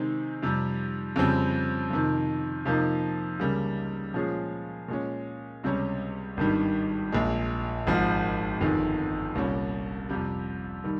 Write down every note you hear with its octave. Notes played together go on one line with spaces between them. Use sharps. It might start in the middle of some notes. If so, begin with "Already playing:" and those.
Already playing: C3 D#3 G#3 C4 D#4
F2 C3 G3
F2 C#3 G3 C4
F2 C3 D#3
F2 C3 F3 A#3 D#4
C#2 C#3 G3 A#3
A#2 F3 G#3 C#4 G#4
A#2 G#3 C#4
C#2 C3 G3 C#4
G#1 G2 D#3 G3
A#1 A#2 G#3
G#1 G#2 F3
G1 F2 D#3 G#3
C2 A#2 G3 C#4
F2 C3 G3
D#3 G3